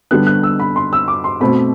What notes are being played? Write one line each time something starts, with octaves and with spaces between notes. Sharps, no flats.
D3 G3 B3 F#6
F#6
E6
B5
C6
E6
D6
C6
B2 A3 C4 B5